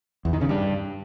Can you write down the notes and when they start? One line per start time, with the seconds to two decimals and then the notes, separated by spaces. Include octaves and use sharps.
0.25 E2
0.33 D#3
0.41 C#3
0.49 G2